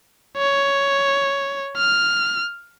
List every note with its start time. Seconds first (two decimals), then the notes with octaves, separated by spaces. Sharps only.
0.37 C#5
1.77 F6